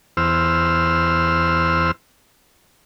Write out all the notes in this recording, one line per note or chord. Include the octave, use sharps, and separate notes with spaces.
E2 C5 E6 F6